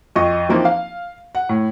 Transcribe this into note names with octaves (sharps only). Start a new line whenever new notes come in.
F2 D#5 C#6
E3 F3 A#3 C4 D#4
F5
F#5
A2